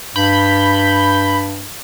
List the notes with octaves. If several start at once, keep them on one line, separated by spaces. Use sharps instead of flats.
G2 B5 G6